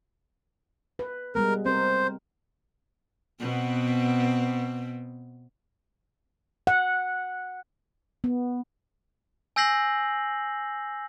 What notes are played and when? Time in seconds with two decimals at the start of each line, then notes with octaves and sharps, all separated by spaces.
0.99 B4
1.35 G3 G#3 B3 A#4
1.66 C4 A#4 C5
3.40 B2 B3 C4
6.67 F#5
8.24 B3
9.56 G#5 E6 G6 A#6 C7 F#7